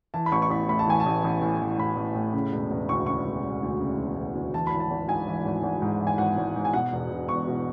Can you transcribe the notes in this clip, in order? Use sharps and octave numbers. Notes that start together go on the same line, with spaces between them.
E3 A5
B5
A1 C#6
C#6
A1 B5
A2 B5
A5
E3 G#5
A5
A1
A1
A2
E3
A1 B5
A1
A2
C#3
E1
E1
D2 C#6
C#3 C#6
E1
E1
D2
C#3
E1
E1
D2
E3 A5
G#1 B5
A5
G#1
G#2 G#5
E3
G#1
G#1
G#2
E3
G#5
G#1 F#5
G#1
G#2
G#5
B2 F#5
E1
E1
E2 C#6
B2